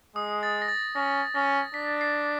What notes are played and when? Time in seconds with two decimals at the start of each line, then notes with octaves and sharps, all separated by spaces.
0.16 G#3 D#6
0.43 A6
0.62 A#6
0.68 A6
0.95 C#4 A#6
1.35 C#4 A#6
1.74 D4 B6
2.01 C7